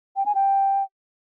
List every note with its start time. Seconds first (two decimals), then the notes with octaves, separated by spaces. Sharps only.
0.16 G5
0.26 G#5
0.35 G5